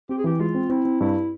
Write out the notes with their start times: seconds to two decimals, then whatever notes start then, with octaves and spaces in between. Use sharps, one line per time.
0.09 C4 G4
0.18 G#4
0.24 E3 G4
0.40 G#3 F4
0.55 C4
0.70 C4 E4
0.85 C4
1.01 G2 E4